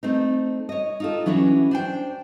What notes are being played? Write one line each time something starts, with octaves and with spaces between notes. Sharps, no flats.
A3 C4 D#4
C#5 D#5
D#4 F4 A4
E3 F#3 C#4 D4 E4
D4 C5 G5